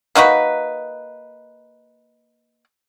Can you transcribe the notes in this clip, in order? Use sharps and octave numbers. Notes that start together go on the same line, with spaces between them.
A#3 D#4 F#4 B4